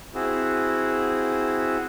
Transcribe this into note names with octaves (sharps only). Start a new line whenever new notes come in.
C4 E4 F#4 G#4